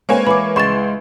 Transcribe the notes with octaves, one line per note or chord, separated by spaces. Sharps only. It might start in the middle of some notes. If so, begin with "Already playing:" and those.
G#3 A#3 C4 B4 C#5 G#5
E3 B5 D6
C#2 G#3 C6 C#6 A6 E7